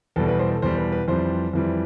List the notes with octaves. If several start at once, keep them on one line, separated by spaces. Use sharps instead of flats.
E2 B2 G3 A4
B4
C5
A4
E2 B2 G3 C5
B4
B4
F2 E3 G3 C5
F2 E3 G3